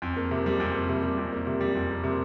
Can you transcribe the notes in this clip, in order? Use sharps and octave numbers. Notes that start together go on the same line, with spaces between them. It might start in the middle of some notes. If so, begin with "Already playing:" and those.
F2
A#3
C3
G3
F2
A#3
C3
G3
F2
A#3
C3
G3
F2
A#3
C3